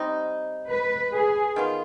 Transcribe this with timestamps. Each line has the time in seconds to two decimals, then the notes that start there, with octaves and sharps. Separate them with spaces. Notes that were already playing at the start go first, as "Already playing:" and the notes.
Already playing: G3 C4 D#4
0.71 B4
1.13 G#4
1.56 D#3 B3 F4